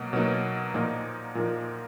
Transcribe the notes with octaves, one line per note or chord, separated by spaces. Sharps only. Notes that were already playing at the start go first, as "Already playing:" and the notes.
Already playing: B2 F#3 A#3
B2 F#3 A#3 D#4
A#2 F3 A#3 D#4 A#4
A#2 F3 A#3 D#4 A#4